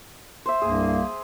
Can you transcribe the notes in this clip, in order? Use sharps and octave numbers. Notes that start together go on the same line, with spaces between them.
C5 E5
C2 G2 A#3 G#4